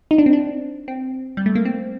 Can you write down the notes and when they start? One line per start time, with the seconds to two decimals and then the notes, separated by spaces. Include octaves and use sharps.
0.11 D#4
0.18 D4
0.26 C4
0.33 D4
0.88 C4
1.37 G3
1.46 A3
1.55 A#3
1.65 C4